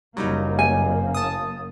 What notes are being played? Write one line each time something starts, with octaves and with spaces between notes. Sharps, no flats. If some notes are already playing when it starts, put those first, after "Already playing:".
F#1 F#2 F#3 G3 A#3 D#4
G#5
A5 D#6